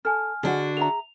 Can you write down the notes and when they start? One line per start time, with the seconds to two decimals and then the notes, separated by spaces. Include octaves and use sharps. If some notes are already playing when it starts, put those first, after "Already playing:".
0.05 A4 G#5 F6
0.43 D3 D4 F#4 G#4 D#5
0.77 G#4 E5 A#5 F7